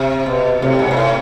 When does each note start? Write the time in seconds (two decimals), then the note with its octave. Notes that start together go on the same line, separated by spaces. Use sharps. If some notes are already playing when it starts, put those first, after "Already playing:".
Already playing: C3
0.26 B2
0.61 A2 C3
0.79 G#2
0.91 A#2
0.97 A2